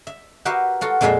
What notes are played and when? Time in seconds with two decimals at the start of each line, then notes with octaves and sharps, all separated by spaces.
0.07 E5
0.45 F#4 G4 A#4 B4 E5 F5
0.81 F4 F#4 A4
1.01 F2 A#2 G#3 F4 E5 F5